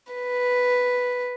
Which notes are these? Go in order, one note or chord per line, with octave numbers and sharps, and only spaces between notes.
B4